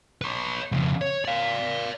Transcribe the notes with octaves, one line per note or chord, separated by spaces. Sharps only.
B4 C#5
F2 C#3
C#5
D5 F5